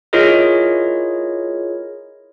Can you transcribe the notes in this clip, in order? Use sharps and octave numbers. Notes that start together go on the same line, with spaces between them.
E4 F4 G#4 A#4 C#5 D#5